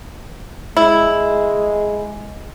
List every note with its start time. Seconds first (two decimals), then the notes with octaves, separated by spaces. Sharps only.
0.77 G#3 E4